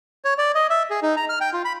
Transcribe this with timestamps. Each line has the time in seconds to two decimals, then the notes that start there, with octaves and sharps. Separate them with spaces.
0.25 C#5
0.38 D5
0.55 D#5
0.70 E5
0.90 G#4
1.03 D#4
1.17 A#5
1.29 F6
1.41 G5
1.53 F4
1.65 B5